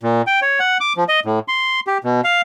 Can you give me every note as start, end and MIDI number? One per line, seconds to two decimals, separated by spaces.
0.03 0.22 46
0.27 0.40 79
0.42 0.59 73
0.60 0.78 78
0.80 0.93 86
0.97 1.04 53
1.09 1.20 75
1.25 1.39 45
1.48 1.80 84
1.87 1.98 67
2.04 2.21 47
2.24 2.41 77